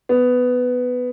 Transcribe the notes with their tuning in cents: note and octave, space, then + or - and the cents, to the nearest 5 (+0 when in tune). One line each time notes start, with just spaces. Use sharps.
B3 +10